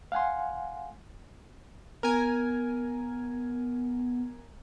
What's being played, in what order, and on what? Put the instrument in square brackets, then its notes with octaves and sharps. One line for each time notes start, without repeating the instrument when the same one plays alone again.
[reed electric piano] F5 F#5 G#5 C6
[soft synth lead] B3 [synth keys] A#4 G#5